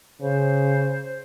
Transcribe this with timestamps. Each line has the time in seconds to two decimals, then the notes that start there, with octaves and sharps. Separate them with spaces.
0.21 C#3 C5